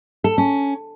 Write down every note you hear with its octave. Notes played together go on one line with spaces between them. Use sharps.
A4
C#4